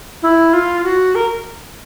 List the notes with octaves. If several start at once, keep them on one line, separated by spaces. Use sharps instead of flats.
E4
F4
F#4
A#4